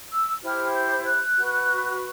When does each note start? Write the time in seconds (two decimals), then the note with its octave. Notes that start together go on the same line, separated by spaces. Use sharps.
0.11 E6
0.42 E4 G4 C5 F6
0.74 G6
1.06 F#6
1.36 F#4 B4